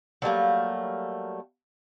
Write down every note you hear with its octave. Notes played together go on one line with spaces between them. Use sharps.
F#3 G3 A3 A#3